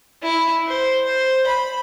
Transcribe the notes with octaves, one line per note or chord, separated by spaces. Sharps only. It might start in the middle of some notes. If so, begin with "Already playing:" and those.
E4
C5
C5
B5